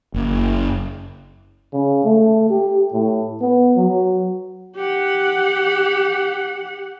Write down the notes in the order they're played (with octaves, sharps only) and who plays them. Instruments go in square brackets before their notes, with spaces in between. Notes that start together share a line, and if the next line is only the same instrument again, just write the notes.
[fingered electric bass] F#1
[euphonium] C#3
A3
G4
A2
B3
F#3
[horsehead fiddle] G4 F#5